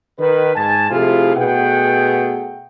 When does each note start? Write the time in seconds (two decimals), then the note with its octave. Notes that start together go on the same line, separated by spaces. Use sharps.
0.20 D#3 B4
0.56 G#2 G#5 A5
0.90 C3 F3 A3 E4 F4 G#4
1.36 B2 A3 B3 G#4 F#5 G5